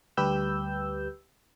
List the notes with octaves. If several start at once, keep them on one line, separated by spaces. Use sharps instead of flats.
D2 G3 G4 B4 E6 G6